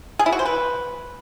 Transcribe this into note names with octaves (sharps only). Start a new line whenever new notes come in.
G#4
E4
F#4
C5
B4